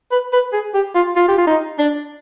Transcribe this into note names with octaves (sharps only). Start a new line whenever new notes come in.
B4
B4
G#4
G4
F4
F4
G4
F4
D#4
D4